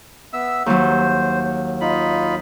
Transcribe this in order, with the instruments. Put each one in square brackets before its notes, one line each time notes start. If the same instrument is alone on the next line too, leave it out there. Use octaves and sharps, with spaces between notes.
[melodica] B3 E5 E6
[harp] D#2 F#3 [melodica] C5
[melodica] D#4 F4 B5